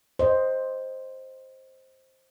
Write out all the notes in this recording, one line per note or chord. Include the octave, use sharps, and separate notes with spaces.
C5 D#5